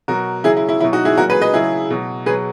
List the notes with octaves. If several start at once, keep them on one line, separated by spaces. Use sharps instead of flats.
B2 F#3 F#4 A#4
C#3 F#3 E4 G#4
E4
E4
B2 F#3 E4
D#4 F#4
E4 G#4
A#2 F#3 F#4 A#4
G#4 B4
B4 D#5
C#3 F#3 E4 G#4
B2 F#3
B2 F#3 G#4 B4